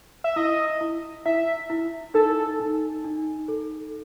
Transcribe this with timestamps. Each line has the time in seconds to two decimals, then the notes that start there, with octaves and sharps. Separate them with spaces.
0.24 E5
0.36 E4 D#5
0.81 E4
1.25 E4 E5
1.70 E4
2.14 D#4 A4
2.60 D#4
3.04 D#4
3.48 A4